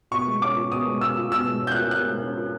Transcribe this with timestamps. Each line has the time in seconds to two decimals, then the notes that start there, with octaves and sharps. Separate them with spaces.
0.11 B2 C#6
0.27 G#3
0.42 C#4 D6
0.56 F4
0.72 B2 D#6
0.87 G#3
1.01 C#4 E6
1.17 F4
1.32 B2 E6
1.47 G#3
1.61 C#4
1.67 G6
1.72 F4 F#6
1.91 B2 F#6
2.06 G#3
2.22 C#4
2.36 F4